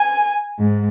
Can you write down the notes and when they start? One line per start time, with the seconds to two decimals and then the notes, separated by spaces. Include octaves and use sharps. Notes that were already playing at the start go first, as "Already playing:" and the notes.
Already playing: G#5
0.59 G#2